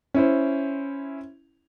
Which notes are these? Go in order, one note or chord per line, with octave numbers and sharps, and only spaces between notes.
C#4 E4 C5